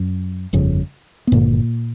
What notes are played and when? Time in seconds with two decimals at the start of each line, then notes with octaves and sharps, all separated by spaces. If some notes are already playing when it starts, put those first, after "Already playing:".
Already playing: F#2 F#3
0.53 G1 F2 C#3
1.27 B3
1.32 G#1 G2 A#2 D3 A#3